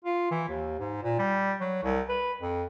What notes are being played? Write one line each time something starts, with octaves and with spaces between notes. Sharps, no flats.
F4
E3
D#2
G#2
A#2
G3
F#3
C2
B4
F2